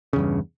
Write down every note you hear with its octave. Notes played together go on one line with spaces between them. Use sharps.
E2 G2 C#3